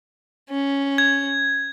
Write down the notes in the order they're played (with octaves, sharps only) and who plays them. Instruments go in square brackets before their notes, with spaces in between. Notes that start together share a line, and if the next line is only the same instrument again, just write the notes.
[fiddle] C#4
[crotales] G#6